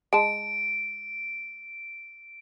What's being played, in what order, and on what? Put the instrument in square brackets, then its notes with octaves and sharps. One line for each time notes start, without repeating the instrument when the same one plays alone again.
[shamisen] G#3 A5 [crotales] D7